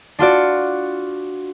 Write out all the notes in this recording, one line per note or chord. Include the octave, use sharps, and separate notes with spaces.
D4 F4 F#4 D5